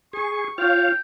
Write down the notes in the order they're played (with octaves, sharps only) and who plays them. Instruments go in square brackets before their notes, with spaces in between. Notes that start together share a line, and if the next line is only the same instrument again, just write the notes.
[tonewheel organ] G#4 [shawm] C#6
[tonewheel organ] F4 C#5 F5 [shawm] G5